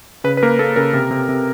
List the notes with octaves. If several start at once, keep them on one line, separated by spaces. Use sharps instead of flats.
C#3 B4
B4
A#3 A#4
A#3 A4
C#3 A#4
C3
C3
C3